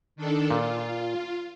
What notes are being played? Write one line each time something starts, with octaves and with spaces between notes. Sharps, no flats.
D#3 D4 A4
A#2 F4